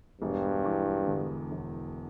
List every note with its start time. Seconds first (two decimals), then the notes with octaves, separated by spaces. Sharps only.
0.21 E1 G2
0.64 E2
1.08 D3
1.51 E1